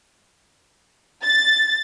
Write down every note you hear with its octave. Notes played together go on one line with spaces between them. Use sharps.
A6